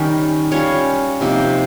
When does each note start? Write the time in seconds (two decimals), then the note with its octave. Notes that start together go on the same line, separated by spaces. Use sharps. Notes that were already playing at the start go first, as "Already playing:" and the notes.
Already playing: D#3 G3 C#4
0.52 G3 C#4 F4 C#5
1.21 C3 F3 A#3 D#4